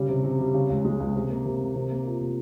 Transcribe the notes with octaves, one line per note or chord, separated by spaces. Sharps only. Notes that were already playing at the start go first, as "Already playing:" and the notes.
Already playing: C#3 G3
C3
C3
G3
C#3
C#2
G#3
C#2
C3
A#3
C3
A#3
C3
A#3
F4
C3